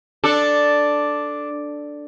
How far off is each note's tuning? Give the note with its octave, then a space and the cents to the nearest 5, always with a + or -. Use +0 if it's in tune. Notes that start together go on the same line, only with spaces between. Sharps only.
D4 +0 A4 +0